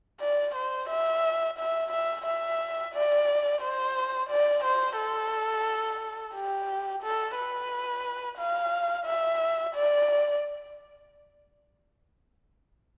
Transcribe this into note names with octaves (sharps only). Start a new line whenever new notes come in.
D5
C5
E5
E5
E5
E5
D5
C5
D5
C5
A4
G4
A4
B4
F5
E5
D5